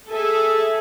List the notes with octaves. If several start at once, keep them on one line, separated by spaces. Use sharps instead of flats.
G#4 A4 E5 G#5